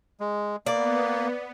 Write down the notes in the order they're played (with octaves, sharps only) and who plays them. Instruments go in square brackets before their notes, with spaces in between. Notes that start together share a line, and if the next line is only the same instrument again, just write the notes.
[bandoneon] G#3
[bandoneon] A#3 [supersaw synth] B3 [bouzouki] D5